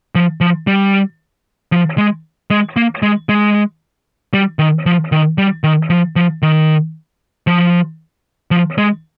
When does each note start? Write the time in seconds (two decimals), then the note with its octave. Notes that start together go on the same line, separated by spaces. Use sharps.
0.15 F3
0.41 F3
0.67 G3
1.72 F3
1.98 G#3
2.50 G#3
2.76 A#3
3.03 G#3
3.29 G#3
4.34 G3
4.59 D#3
4.86 F3
5.12 D#3
5.38 G3
5.64 D#3
5.90 F3
6.16 F3
6.42 D#3
7.47 F3
8.51 F3
8.78 G#3